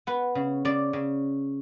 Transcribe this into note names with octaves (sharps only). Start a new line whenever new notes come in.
B3 B4
C#3
C#3 D5
C#3